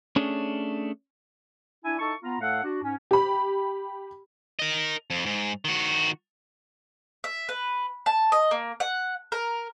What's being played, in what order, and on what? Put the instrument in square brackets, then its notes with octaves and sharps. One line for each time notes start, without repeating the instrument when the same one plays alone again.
[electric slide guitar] A3 C#4 D4 G#4 C#5
[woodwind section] D4 E4 G#5
D#4 E4 A4 A5 C#6
B3 F4 A#5
A2 A3 A4 F5 F#5
D4 F#4
G#2 C#4
[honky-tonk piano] G4 B5
[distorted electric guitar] A#4 D#5
F2
G#2
D#3 F#4
[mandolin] E5
B4
A5
D#5
A#3
F#5
A#4